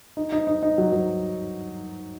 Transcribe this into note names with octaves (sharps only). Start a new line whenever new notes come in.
D#4
D#4
D#4
D#4
F#3
F#3